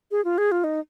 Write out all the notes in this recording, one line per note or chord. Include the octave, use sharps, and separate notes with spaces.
G#4
F4
G#4
F4
D#4